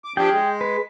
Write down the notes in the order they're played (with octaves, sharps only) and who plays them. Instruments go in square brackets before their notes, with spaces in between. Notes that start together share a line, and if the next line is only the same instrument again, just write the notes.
[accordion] D6
[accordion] F3 D4 G4 [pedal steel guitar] G#4 G5
[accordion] G#3
[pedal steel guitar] B4